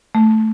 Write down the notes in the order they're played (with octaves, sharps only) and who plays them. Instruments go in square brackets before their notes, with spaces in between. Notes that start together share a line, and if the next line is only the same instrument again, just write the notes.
[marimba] A3